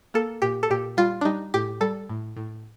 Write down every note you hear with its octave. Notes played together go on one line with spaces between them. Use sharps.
A#3 A4
A#2 G4
A4
A#2 G4
G3 F4
D4
G3 D#4
A2 G4
G3 A4
A2
A2